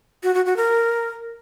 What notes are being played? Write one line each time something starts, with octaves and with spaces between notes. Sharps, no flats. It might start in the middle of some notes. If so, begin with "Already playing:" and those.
F#4
F#4
F#4
A#4